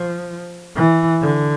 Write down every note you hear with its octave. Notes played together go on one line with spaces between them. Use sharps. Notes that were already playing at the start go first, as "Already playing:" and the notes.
Already playing: F3
E3
D3